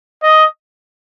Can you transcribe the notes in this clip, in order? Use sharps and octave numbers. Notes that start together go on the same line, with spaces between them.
D#5